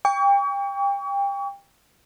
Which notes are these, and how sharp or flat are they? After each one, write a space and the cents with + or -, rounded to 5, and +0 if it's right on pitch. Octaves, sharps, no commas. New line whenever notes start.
G5 +30 C#6 +40